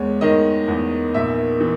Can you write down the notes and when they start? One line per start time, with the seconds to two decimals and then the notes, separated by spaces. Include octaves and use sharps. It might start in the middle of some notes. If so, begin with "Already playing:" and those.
Already playing: E2 G#3 C#5
0.21 D#3 D#5
0.68 E2
1.14 A#1 E5
1.61 E3